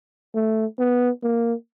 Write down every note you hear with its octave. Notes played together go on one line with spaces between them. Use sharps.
A3
B3
A#3